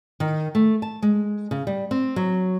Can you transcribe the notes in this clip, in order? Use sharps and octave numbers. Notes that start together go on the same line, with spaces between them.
D#3
A3
A5
G#3
C#3
G3
C4
F#3